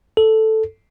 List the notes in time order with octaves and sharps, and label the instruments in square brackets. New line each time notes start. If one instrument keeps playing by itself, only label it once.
[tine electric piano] A4